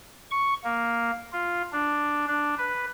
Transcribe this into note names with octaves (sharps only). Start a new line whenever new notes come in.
C#6
A#3
F4
D4
D4
B4